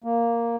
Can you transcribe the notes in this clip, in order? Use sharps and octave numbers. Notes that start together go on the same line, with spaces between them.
A#3